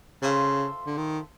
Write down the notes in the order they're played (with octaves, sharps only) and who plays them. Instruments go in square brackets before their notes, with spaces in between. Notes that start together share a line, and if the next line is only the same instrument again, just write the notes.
[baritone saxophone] C#3 [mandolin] F4 A4 C5 E5
[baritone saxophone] D3
D#3